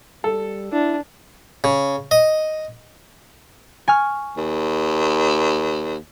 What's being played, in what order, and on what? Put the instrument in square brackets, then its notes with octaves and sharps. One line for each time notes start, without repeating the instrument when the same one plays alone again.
[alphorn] G3 [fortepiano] A4
[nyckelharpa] D4 [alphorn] E4
[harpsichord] C#3
D#5
[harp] G#5 C#6 F6
[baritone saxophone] D#2